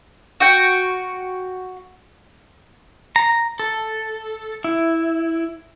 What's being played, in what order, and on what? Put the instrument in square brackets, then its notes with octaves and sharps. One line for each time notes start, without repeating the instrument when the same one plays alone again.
[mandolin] F#4 G5
[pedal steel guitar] A#5
A4
E4